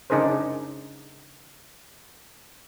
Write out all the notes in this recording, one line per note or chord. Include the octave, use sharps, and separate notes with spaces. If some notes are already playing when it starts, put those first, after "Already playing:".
C#3 D4 D#4 G#4 A#4 C5